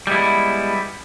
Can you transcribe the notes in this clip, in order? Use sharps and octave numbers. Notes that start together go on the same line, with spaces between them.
G3 G#3 B3 E4